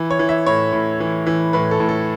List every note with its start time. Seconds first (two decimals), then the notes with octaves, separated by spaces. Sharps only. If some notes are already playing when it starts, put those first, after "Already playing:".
Already playing: E3
0.10 C#5
0.19 E3
0.29 E5
0.46 A2 C#5
0.73 A2
1.00 E3
1.26 E3
1.53 A2 B4
1.71 A4
1.80 A2
1.89 A4